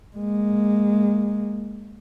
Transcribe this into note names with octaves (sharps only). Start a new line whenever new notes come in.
G#3 A#3